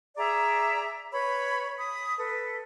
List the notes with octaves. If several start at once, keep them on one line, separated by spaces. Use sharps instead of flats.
G#4 D5 E5 A#5
B4 C#5 B5
B5 D#6
A4 B4